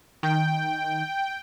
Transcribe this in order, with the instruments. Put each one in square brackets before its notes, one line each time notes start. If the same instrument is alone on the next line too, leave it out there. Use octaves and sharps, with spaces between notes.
[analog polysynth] D#3 [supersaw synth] G5